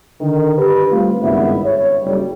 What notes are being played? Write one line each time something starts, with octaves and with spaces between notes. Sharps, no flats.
D3 D#3
G4 B4
G3 A3 C4 F4
G#1 C#2 G2 B3 E4 E5
C#5
F#1 G3